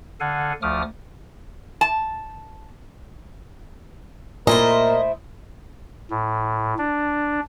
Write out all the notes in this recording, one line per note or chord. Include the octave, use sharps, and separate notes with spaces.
D3 A4 F5 F#5 G#5
D2 F3 A3 D6 D#6 F6
A5
A#2 A3 E4 A#4 C5 D#5
A2
D4